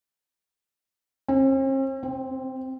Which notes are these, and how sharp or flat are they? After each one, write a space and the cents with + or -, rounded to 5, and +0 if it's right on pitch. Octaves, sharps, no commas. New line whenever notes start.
C4 +45
C4 -5